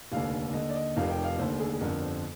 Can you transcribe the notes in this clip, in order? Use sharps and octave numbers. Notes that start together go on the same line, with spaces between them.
F1 D#2 D3 F5
D#2 D3 D#5
D5
D#5
F1 F2 C3 D#3 F5
G5
F5
F1 D#2 D3 C5
G#4
G#4
G1 F2 D3 A#4
C5